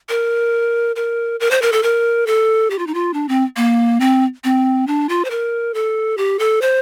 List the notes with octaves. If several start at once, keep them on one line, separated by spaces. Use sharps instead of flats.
A#4
A#4
A#4
C5
A#4
A4
A#4
A4
G4
F4
D#4
F4
D4
C4
A#3
C4
C4
D4
F4
C5
A#4
A4
G4
A4
C5